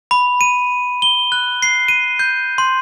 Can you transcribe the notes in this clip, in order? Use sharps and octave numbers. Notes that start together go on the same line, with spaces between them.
B5
D#7
G7
F#6
C7
D#7
G6
C6